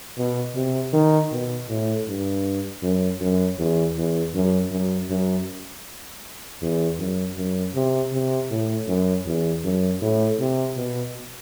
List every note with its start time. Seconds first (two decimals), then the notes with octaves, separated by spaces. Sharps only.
0.18 B2
0.55 C3
0.93 D#3
1.32 B2
1.69 A2
2.07 G2
2.82 F#2
3.20 F#2
3.58 E2
3.97 E2
4.35 F#2
4.71 F#2
5.10 F#2
6.62 E2
6.98 F#2
7.37 F#2
7.75 C3
8.12 C3
8.51 A2
8.88 F#2
9.26 E2
9.64 F#2
10.02 A2
10.39 C3
10.77 B2